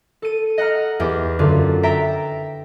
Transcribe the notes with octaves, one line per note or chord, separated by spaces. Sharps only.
A4 D#7
D#5 F#5 A#5 F6
E2 G4
F#2 D3 F4
E5 G5 A#5 A6 B6 D7